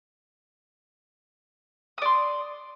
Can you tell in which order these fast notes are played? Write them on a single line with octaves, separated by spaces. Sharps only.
D#6 D5 C6